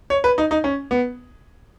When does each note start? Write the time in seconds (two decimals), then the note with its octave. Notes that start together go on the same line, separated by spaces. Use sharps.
0.10 C#5
0.24 B4
0.38 D#4
0.51 D#4
0.64 C#4
0.91 B3